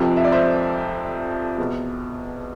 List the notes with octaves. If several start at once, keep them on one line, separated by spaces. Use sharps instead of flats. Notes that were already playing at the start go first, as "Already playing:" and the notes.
Already playing: F1 F2 C3 F3
E5
D5
C5 E5
E2 B2